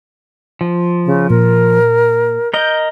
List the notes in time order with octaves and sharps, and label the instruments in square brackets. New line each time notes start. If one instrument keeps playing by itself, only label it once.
[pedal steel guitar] F3
[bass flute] C#3
[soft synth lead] A#2 [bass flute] A#4
[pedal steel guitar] A#4 D#5 [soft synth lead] G6